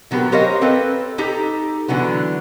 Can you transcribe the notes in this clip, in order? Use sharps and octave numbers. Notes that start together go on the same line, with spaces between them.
D3 F#3 B3 G4 A#4
G4 A#4 C5 C#5 D#5 F5
C4 A4 B4
D#4 G4 A4 A#5
D3 E3 F#3 B3